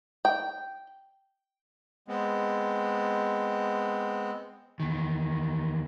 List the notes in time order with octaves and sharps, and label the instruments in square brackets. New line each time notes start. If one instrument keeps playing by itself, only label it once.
[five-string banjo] G5
[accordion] G#3 B3 C4
[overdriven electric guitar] E2 D#3